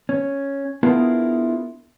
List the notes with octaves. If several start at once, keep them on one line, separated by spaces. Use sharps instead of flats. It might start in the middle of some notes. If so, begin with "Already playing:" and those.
C#4
B3 D4 E4 F4 G#4 A#4